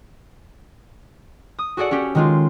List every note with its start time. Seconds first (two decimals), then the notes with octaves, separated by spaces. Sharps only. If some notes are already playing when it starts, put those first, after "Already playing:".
1.59 D#6
1.77 F#4 G#4 A4 D5 F#5
1.91 C#4 F#4 G4
2.15 D#3 G#3 F4